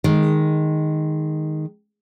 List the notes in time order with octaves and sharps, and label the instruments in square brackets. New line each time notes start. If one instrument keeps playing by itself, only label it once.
[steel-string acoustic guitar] D#3 G#3